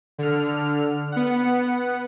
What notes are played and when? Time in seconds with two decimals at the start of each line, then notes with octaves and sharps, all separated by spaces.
0.18 D3 F6
1.12 B3 F#5